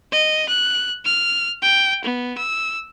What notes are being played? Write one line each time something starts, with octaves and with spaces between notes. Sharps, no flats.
D#5
F#6
F6
G5
B3
E6